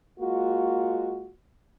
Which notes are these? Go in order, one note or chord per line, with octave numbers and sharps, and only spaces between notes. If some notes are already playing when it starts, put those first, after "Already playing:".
G#3 A#3 F4 F#4